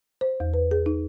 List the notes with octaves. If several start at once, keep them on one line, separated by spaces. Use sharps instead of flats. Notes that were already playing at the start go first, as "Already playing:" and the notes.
C5
E2
B4
G#4
D#4